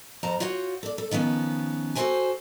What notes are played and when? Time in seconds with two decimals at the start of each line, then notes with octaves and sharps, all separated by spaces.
0.23 F2 C5 A5 A#5
0.40 F4 F#4 C#5 F#5 G5
0.83 A4 D5
0.98 A4
1.11 D#3 F3 B3 C#4
1.95 F#4 A4 B4 C5 G5 G#5